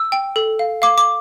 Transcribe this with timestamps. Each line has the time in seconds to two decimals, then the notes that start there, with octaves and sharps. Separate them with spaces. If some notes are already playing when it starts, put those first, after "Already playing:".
Already playing: E6
0.12 G5
0.36 A4
0.59 F5
0.82 F5 D6
0.98 D6